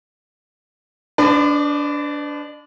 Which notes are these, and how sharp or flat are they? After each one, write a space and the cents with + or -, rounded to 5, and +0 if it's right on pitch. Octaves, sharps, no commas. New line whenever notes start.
D4 -20 B4 +40 D5 +40